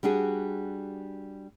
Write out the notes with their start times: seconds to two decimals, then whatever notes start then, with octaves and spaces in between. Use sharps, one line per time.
0.03 G3 D4 F#4 G#4